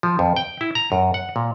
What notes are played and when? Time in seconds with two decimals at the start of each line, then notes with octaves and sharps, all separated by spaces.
0.03 F3
0.19 F2
0.36 G5
0.61 E4
0.75 A#5
0.92 F#2
1.14 F#5
1.36 A#2